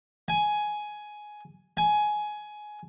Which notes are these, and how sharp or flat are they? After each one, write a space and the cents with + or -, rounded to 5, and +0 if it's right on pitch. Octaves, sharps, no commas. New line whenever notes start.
G#5 +10
G#5 +15